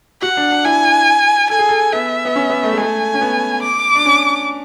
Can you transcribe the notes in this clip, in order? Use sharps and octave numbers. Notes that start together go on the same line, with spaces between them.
F#4 F#5
D4
D4
E4 G#5
A4 G#5
G#4
A4
B3 E5
B3
C#4
B3
A3
G#3
A3 G#5
C#4
B3
D6
D4
C#4